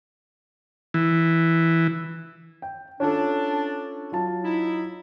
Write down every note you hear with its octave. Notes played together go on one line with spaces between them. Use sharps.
E3
G5
C#4 D4 F4 A4
F#3 F4 A5
D#4 E4